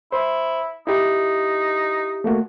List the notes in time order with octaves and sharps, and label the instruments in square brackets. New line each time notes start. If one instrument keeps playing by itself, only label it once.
[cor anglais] E4 [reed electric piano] C5
[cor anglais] D#4 [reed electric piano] E4 G4
[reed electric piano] A3 A#3 F#4